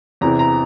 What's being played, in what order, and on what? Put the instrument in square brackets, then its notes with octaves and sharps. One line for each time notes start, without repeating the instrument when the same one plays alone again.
[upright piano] E2 C3 E3 A#5
A#5